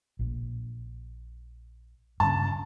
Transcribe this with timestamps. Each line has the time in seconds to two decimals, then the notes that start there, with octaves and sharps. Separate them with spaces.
0.19 A#1
2.20 G2 C#3 A5